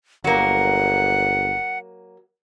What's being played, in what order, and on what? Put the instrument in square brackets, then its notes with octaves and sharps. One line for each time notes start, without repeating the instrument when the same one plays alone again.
[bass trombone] G1 [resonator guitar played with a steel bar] F#3 A#3 [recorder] F#5